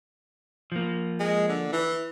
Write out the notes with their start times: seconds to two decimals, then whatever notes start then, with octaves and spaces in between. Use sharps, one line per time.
0.72 F3 A#3
1.20 G#3
1.48 D3
1.72 E3